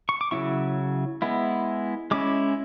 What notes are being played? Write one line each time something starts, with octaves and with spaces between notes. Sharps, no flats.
C#6
D6
C#3 F#3 C#4 E4 C#6
G#3 B3 E4
G#3 C#4 E4 D6